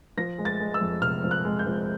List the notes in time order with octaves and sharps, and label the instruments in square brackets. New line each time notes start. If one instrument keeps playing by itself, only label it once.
[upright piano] F3 A#6
G#3
A6
G#3
E6
F2
C3 F6
F3
F#6
G#3
G6
F3